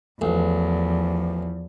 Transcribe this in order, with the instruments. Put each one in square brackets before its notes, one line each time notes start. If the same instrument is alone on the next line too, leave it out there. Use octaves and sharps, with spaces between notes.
[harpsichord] A1 [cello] E2 [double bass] F3